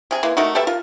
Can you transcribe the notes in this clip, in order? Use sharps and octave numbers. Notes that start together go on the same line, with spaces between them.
C3 G#4
E3 G#3 A#3
A3 D#4 F#4 A#4
G4 A4 B4 E5
F4 A#4